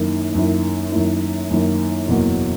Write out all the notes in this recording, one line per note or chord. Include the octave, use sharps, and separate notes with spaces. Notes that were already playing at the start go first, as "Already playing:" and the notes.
Already playing: F#2 D#3 A#3 E4
F#2 D#3 A#3 E4
F#2 D#3 A#3 E4
F#2 D#3 A#3 E4
F#1 E2 B2 F#3 A#3